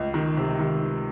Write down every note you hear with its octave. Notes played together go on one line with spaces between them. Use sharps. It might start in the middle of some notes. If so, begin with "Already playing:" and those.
Already playing: C#2
D#3
C3
D#3